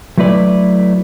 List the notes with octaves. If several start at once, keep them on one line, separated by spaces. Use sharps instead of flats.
F#3 A3 E4 B4 D5